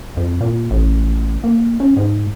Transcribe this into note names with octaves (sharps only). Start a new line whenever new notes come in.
F2
A#2
A1
A#3
C#4
G#2